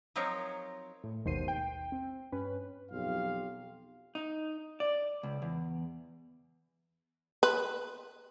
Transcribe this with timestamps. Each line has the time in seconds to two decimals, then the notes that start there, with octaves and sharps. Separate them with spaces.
0.16 F3 F#3 C4 D#4 A#4 C#5
1.04 A2
1.25 G#1 D#2 B2 C5 C7 D#7
1.48 G5
1.92 C4
2.32 G2 C#4 B4
2.91 B1 F2 F#3 F4 G4 F5
4.15 D#4
4.80 D5
5.23 C#2
5.42 E2
7.43 B4